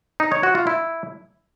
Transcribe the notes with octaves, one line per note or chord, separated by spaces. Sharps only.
D#4
C#5
F#4
F4
E4